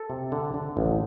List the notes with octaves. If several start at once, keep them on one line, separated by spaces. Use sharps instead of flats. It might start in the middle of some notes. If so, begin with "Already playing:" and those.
Already playing: A4
C3
D3
D3
A1